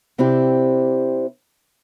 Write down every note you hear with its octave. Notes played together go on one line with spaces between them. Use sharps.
C3 C4 D4 E4 G4